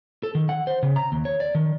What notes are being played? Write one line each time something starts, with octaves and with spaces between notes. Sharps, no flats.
A4
D#3
F#5
C5
C#3
A#5
D#2
C#5
D5
D#3